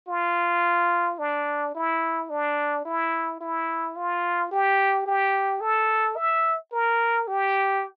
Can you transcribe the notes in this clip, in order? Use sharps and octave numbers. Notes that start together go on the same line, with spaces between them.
F4
D4
E4
D4
E4
E4
F4
G4
G4
A4
E5
A#4
G4